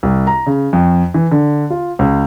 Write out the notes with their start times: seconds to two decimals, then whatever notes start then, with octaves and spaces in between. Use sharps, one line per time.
0.03 C2
0.27 A#5
0.46 C#3
0.73 F2
1.14 E3
1.31 D3
1.70 F4
1.99 C#2